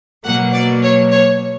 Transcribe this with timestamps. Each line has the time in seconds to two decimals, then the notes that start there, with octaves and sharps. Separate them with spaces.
0.25 B2 F#3 A#3 F#5
0.53 D5
0.82 C#5
1.11 C#5